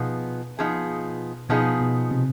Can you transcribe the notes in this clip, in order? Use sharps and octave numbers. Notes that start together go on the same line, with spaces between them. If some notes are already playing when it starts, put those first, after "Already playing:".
Already playing: B2 F3 B3 D#4 G#4
F3 B3 D#4 G#4
B2 F3 B3 D#4 G#4
B2
C3